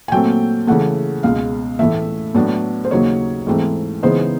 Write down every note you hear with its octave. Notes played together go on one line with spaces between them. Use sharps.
G#5
A#2 F#3 A3 C4 G5
C#3 E3 A3 F#5
C#2 B2 G#3 F5
A2 E3 A3 E5
A2 F#3 B3 D4
C5
D#2 C#3 F#3 A#3 D#4 C#5
G#2 E3 A3 C4
C#3 E3 G#3 B3 D#4 C5